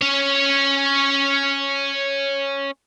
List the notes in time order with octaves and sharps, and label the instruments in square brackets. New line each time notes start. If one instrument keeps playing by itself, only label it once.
[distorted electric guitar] C#4 C#5